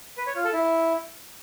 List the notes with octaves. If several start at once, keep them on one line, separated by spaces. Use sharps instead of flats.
B4
C#5
F4
A4
E4